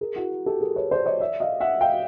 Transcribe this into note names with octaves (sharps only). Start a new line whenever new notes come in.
G#4 A#4
E4 F#4
G4 A4
G#4 A#4
B4 C#5
C5 D5
C#5 D#5
D5 E5
D#5 F5
E5 F#5
F5 G5